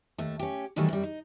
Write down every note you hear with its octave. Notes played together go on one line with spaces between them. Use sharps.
D#2 A3
C#4 G4
A#2 D#3 E3 F#3 G3 A3
F#2 G3
D#4